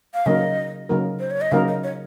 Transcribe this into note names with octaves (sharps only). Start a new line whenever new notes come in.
F5
C#3 F#3 A#3 D#4 A#4 D#5
C#3 F#3 A#3 D#4 A#4
C5
C#5
D#5
C#3 F#3 A#3 D#4 A#4 F5
D#5
C#5